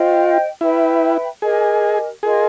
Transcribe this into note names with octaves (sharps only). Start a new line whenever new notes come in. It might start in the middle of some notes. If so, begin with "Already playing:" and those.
Already playing: F4 C5 D#5 G5
E4 B4 E5 G5 B5
G4 G#4 A#4 D#5 G#5
F4 G#4 A#4 D#5